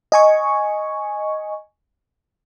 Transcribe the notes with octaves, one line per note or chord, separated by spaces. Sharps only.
D#5 G#5 C#6